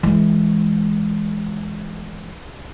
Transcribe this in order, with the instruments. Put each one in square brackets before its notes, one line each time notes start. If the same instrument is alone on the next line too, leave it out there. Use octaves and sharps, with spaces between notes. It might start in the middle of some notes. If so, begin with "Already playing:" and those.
[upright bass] E3 G#3